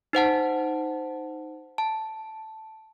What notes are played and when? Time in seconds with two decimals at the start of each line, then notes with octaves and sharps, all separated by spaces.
0.13 D#4 C5 F#5 A5
1.78 A5